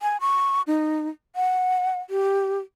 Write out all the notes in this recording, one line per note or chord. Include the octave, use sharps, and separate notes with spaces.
G#5
C#6
D#4
F#5
G4